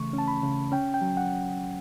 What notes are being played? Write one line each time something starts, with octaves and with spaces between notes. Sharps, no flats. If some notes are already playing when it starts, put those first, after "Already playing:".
Already playing: C#3 E3 A3 C#6
C#4
A5
B5
C#3
C#4 G5
G5
F#3
F#5